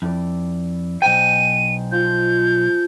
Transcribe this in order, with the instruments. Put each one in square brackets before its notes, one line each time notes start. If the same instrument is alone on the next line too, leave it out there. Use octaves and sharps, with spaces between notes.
[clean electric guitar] F2 [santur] E4 D5
[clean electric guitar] B1 G5 [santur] C5 D#5 G#5 [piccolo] D#7
[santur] F3 [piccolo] G6